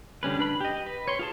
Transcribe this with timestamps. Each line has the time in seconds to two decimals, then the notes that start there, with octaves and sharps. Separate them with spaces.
0.23 D3 G3 C#4 B4
0.39 D4 B4 B5
0.61 G4 D#5
0.86 B4
1.08 C#5 C6
1.19 F4 G#4 A5